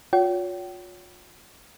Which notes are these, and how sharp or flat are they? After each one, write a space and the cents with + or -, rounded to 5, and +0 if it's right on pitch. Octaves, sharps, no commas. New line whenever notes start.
F4 +35 C#5 +30 G5 -40